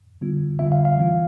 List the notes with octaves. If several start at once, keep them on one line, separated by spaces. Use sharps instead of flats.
D3 G3 B3 F4
D3 G3 B3 F4 E5
F5
F5
E3 B3 F4